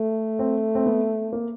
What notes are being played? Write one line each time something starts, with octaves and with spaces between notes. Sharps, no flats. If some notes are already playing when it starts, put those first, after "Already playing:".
Already playing: A3
C4
C4
B3
A#3